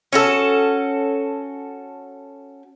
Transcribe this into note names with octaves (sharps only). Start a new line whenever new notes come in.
C#4 F#4 A4